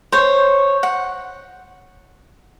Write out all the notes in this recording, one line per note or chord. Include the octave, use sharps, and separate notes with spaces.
C5 C#5
F#5